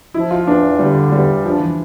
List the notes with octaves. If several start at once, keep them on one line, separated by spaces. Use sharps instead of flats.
F3 E4
F4
E2 D4
D3 G3
E2 G3
F3 D4
E3